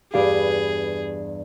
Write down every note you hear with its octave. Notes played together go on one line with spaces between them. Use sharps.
E2 G2 G4 G#4 B4 F5